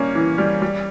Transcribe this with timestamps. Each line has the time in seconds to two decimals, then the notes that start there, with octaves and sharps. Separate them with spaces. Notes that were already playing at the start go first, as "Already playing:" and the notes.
Already playing: G3 A#3 C#4
0.15 E3
0.38 G3
0.62 G3